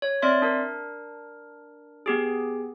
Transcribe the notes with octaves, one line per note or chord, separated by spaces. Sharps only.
C#5
C4 D5 E5 C6
D4 A#4
B3 G4 G#4